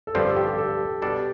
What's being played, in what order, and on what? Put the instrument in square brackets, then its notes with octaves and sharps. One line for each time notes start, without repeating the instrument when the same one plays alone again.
[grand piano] A4
[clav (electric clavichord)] G2 D3 F3 C4 [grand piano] G4
[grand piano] A4
G4
G4
A4
[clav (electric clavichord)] B2 G3 D4 A4 D5 [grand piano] G4